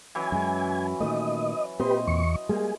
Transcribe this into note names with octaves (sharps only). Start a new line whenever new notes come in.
E3 F#3 C#4 G#5
F#2 G#3
A#2 D#3 A3 D#5
A#2 C4 G4 B4 D#5 C6
E2 C#6
G3 G#3 A#3 G#4